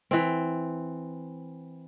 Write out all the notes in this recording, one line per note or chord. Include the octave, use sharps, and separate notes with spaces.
E3 C4